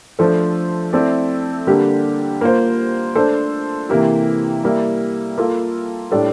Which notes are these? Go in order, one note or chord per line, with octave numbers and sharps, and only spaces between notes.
F3 A3 D4 A4 C5
A3 C4 E4 A4 D5
D3 G3 A#3 D4 G4
A#3 F4 C5
A3 D4 A4 C5
C3 E3 A#3 E4 G4
G3 A#3 E4
A#3 F4 A4
A2 G3 D4 A4 D5